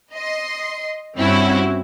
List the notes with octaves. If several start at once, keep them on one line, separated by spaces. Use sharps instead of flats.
D#5 C6
G2 C4 C#4 E4 F#4